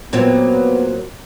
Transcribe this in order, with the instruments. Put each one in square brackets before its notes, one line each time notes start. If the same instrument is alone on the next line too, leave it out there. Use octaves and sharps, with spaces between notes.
[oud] A#2 F#3 C4 [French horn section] B3